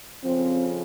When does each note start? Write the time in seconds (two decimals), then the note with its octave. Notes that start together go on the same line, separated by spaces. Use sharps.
0.23 F2 C#3 F3 C4